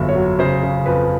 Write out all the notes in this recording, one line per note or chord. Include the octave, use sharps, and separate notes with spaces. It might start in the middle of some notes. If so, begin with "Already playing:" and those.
Already playing: G1 F2 F#3 E5
C#5
F#3
C#3 C5
C#3
F2 B4